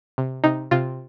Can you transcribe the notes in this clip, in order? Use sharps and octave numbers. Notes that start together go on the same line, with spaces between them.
C3
C3 D#4
C3 F4